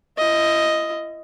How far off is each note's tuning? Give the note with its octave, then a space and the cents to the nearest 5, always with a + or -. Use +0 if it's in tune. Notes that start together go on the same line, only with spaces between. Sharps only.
E4 +40 D#5 +5